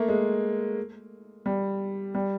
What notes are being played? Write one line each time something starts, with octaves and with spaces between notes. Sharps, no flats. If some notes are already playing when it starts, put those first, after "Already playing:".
Already playing: A3 A#3
G#3
G3
G3